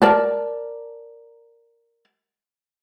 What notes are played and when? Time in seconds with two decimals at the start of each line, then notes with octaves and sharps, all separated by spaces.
0.02 A#4 D5 A5